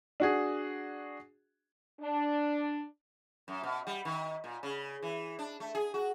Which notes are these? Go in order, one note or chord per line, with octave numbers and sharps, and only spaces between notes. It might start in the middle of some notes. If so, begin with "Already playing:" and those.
D4 F#4 G#4
D4
F#2
B2
G3
D#3
A#2
C#3
E3
D4
A3
G#4
F#4